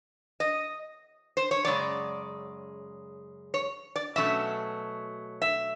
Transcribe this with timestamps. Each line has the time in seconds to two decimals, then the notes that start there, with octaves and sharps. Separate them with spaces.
0.40 D#5
1.37 C5
1.51 C#5
1.65 F#2 C#3 G#3 D5
3.54 C#5
3.96 D5
4.16 B2 F#3 A3 C#4 E5
5.42 E5